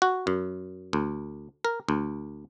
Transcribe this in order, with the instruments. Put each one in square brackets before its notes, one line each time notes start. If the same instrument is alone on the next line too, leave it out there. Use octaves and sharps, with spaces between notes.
[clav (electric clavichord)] F#4
F#2
D2
A#4
D2